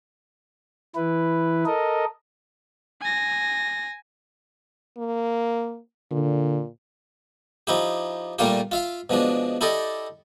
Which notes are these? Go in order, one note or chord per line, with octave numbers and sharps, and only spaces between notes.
E3 E4 B4
A4 A#4 D#5
G#5 A#6
A#3
A#2 D3
F3 D#4 E4 G4
A#2 G3 A3 A#3 F4 G4
F4 E5 F5
B2 F3 G#3 D4
E4 G4 A4 D5 D#5